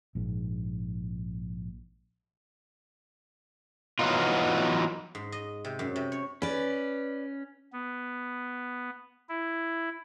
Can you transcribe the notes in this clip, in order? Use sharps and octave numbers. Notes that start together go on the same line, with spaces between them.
A#1 G#2
E3 F#3 G#3 B3 D#4 F4
G#2
D#5
C3
F#2
C3
C#5
C#4 B4 D5
B3
E4